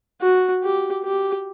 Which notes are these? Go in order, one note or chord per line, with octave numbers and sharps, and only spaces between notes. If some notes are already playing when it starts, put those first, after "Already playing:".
F#4
G4
G4